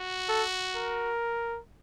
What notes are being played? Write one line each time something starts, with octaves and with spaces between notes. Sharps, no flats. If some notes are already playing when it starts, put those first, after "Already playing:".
Already playing: F#4
A4
A#4